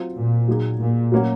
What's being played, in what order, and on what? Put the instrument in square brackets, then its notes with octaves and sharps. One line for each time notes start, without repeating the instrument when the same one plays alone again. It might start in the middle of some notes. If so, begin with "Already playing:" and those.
Already playing: [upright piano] F#3 C4 F4
[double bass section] A#2
[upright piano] F#3 A#3 D#4 G#4
[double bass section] A#2
[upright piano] F#3 A#3 C#4 F#4